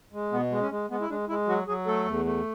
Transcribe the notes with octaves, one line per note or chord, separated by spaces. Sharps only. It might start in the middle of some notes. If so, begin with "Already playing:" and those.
G#3
B2 B3
G#3
C#4
G#3
G#3 B3
E4
G#3 D4
G#3 E4
F#3 F#4
F#3 G#4
A3 A4
E2
A3